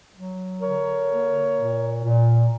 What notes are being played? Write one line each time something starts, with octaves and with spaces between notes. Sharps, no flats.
F#3
D3 A#4 C#5
A#3
A#2
A#2